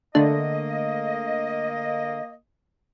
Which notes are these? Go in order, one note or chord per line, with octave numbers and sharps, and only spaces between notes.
D3 A3 A#3 D4 D#5